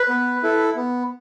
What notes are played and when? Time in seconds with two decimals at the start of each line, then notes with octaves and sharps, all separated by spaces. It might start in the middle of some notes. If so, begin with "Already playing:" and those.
Already playing: B4
0.09 B3
0.43 E4 A4
0.76 B3